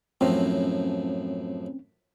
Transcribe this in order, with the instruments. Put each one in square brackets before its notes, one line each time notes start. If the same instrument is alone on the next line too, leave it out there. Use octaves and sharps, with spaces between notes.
[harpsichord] F#2 A2 F3 [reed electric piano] C4 C#4